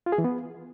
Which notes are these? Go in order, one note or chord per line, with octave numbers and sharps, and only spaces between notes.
F4
G#4
E3
B3